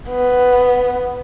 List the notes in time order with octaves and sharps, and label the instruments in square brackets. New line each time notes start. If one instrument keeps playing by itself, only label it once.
[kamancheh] B3